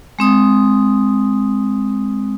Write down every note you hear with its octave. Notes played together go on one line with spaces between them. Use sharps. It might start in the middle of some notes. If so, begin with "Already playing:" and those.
G#3 C4 D#6